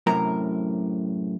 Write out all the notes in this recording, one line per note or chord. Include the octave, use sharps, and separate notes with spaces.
F#2 A2 C3 A#4 A#5